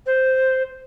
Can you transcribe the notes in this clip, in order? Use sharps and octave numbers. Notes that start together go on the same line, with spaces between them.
C5